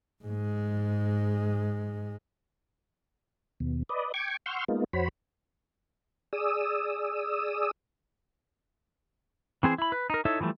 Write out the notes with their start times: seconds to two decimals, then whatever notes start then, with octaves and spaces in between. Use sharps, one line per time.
0.24 G#2 G#3
3.60 D#2 B2
3.89 B4 D5 D#5
4.14 G5 C#6 D6 G#6
4.46 F#5 C6 C#6 E6 F6 G6
4.68 G#3 A#3 B3 D#4 F4
4.93 F2 F#4 C5 C#5 B5
6.33 G#4 D5 D#6 E6
9.63 E3 C4 G#4 C5
9.78 E4 B5
9.92 B4
10.10 D#4 A#4
10.25 D#4 E4 A4 C#5 E5
10.41 E3 F3 G3 A3